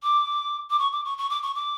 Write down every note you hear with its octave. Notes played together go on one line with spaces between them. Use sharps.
D6
D6
C#6
D6
C#6
C#6
D6
C#6
D6